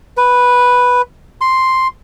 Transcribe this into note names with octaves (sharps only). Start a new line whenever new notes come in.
B4
C6